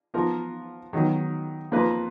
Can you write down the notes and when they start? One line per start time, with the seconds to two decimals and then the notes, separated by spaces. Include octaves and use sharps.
0.14 F3 B3 F4 A#4
0.93 D#3 F#3 B3
1.72 F2 F3 A#3 F4 B4